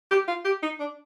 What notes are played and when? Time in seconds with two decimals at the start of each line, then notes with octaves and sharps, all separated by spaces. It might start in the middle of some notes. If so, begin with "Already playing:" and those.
0.11 G4
0.28 F4
0.45 G4
0.63 D#4
0.80 D4